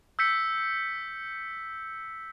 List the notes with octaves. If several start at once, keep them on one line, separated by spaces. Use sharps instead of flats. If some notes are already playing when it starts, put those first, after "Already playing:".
E6 G6 B6 C#7